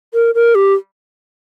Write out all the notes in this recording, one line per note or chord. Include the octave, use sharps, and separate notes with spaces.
A#4
A#4
G4